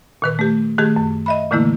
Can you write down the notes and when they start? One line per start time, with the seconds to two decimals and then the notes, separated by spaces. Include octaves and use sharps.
0.22 A#2 D#3 B4
0.39 A3 G4
0.78 D#3 A3 G4 G#4
0.96 F#2
1.26 D#5 E5 B5
1.51 A#2 D3 E3 A3 A#3 E4